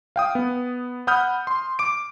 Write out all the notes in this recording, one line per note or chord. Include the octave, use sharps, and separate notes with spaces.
F5 G5 D#6
B3
F#5 B5 D#6 F6 G6
C6
D6 D7